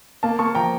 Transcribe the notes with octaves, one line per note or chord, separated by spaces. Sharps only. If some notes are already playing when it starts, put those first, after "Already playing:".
A#3 F5 A5
A#3 A5 C#6
F3 G5 A#5